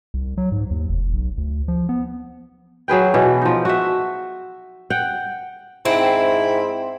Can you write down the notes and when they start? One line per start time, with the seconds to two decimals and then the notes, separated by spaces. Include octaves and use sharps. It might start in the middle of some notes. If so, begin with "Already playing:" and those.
0.14 C2
0.38 F#3
0.52 G#2
0.71 D#2
0.89 F1
1.13 B1
1.38 D2
1.68 F3
1.89 B3
2.88 F#3 G#4 B4 G5
3.14 B2 E3
3.42 F3 D#4
3.65 F#4 E5
4.90 F#5 G5
5.85 G#2 C4 E4